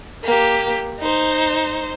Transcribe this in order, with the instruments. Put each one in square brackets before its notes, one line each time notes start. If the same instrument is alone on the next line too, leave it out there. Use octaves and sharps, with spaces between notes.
[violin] A#3 G4
D#4 C5